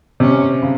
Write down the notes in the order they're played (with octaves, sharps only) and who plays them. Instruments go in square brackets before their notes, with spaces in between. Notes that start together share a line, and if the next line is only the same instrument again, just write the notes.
[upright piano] C3 [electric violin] C#4
[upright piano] C#3